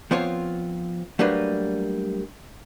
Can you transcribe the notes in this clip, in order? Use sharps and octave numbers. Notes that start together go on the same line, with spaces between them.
F3 B3 C4 F4 C#5
F#3 G3 A3 A#3 D4 B4